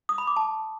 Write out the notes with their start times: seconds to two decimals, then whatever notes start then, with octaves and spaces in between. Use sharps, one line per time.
0.09 D#6
0.18 B5
0.27 D6
0.36 A5